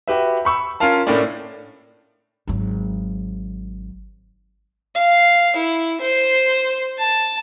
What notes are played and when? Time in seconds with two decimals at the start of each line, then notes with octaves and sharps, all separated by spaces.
0.08 F#4 G4 B4 E5
0.45 B5 C#6 E6
0.80 C#4 F4 A#4 F5 A5
1.07 A2 A3 A#3 C#4 D4
2.47 G#1 F#3
4.95 F5
5.56 E4
6.01 C5
6.98 A5